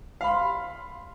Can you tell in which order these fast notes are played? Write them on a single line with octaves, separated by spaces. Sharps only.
F5 B5 C6